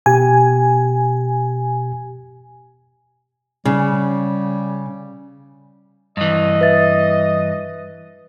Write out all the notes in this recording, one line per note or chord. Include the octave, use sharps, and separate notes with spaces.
B2 G4 G#5
C#3 G3
G2 E3 D#5
B4 E5 A6